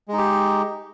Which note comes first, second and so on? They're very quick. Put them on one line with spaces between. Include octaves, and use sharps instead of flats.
G#3 D#4 G4